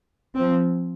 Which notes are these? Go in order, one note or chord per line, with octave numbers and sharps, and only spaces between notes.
F3 C4